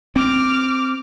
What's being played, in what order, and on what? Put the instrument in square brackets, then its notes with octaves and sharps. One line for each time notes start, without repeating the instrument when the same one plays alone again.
[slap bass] C4 [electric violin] D6 F6